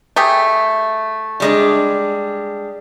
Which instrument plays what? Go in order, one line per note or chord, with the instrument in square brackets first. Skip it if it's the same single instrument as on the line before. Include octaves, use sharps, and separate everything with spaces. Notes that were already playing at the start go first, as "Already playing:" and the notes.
[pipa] A3 G4 G#4
[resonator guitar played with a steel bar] G3 G#3 D4